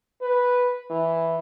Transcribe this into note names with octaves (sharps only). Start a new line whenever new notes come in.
B4
E3